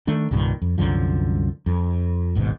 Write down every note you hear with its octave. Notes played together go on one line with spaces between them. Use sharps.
D#3 A3 D4
C2 G2 A#2 D#3
F2
C2 F#2 D3 F3
F2
D1 G#1 G#2 B2